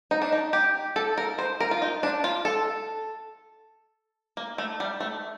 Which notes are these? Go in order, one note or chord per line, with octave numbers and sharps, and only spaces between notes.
D#4
D4
D#4
G4
A4
A#4
C5
A#4
F4
D#4
D4
F4
A4
A#3
A3
G3
A3